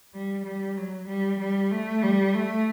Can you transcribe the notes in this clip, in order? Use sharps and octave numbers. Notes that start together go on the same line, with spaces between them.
G3
G3
F#3
G3
G3
A3
G3
A3